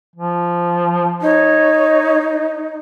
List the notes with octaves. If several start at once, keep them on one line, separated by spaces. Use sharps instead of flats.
F3
D#4 C#5